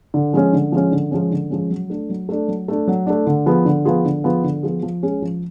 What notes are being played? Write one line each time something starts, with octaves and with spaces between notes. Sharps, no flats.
D3
F3 G#3 C#4
D3
F3 G#3 C#4
D3
F3 G#3 C#4
D3
F3 G#3 C#4
F#3
A3 D4
F#3
A3 D4
F#3
A3 D4
F#3
A3 D4
D3
F3 B3 F4 G#4
D3
F3 B3 F4 G#4
D3
F3 B3 F4 G#4
D3
F3 B3 F4 G#4
F3
G#3 C#4 G#4
F3